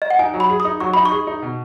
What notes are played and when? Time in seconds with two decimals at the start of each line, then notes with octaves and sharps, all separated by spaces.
0.02 D#5
0.10 F#5
0.19 D#4 G#5
0.34 F#3
0.40 B5
0.50 G#4
0.60 D#6
0.65 D#4
0.80 F#3 C#6
0.94 D#4 B5
1.05 C#6
1.12 G#4
1.27 D#4
1.42 B2